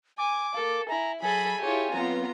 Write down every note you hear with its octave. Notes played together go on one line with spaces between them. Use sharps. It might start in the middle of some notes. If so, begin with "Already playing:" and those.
G#5 D6
A4 A#4 F5
E4 G#5 A#5
F#3 G#4 A4 G#5 B5
E4 F4 G4 G#4 C#5
F#3 B3 C4 F4 C#5 A#5